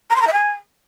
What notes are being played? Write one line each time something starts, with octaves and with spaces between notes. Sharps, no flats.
A#5
C6
A#5
E5
G#5